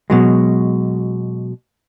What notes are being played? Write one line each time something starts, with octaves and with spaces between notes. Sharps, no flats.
B2 F#3 G#3